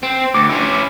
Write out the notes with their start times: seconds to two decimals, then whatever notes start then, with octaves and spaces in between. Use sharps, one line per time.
0.03 C4
0.34 D2 D6
0.49 C#4 E4